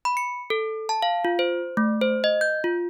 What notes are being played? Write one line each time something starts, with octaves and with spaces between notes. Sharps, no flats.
B5
C#7
A4
A5
F5
F4
C5
A3
C5
D#5
G6
F4